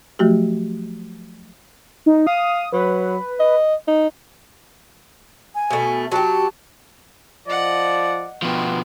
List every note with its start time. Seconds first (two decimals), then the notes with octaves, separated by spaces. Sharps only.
0.19 F3 F#3 A3 F#4 G4
2.06 D#4
2.27 F5 D#6
2.73 F#3 B4
3.39 D#5
3.88 D#4
5.55 G#5
5.70 B2 A3
6.12 F#3 G4 A5
7.47 F3 D5 D#5 F#5
8.42 B2 F3 B3 G5